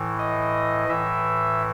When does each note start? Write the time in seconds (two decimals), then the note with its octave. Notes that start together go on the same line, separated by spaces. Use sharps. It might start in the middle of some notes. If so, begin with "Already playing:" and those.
Already playing: A2 E3
0.19 D#5
0.88 A2 E3 E5